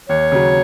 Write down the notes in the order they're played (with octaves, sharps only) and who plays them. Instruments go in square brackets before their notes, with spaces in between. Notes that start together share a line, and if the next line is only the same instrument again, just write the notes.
[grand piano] D#2 [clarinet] C#5
[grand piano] C#3 F#3